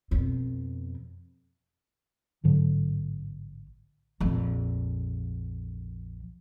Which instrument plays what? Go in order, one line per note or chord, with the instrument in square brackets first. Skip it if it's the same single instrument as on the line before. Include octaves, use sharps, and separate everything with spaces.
[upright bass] F2 B2
[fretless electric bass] A1 G#2 D3 F#3
[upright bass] A#1 F2